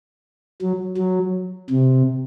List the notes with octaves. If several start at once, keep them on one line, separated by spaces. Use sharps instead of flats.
F#3
F#3
C3